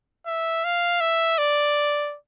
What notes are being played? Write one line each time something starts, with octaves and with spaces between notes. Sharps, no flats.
E5
F5
E5
D5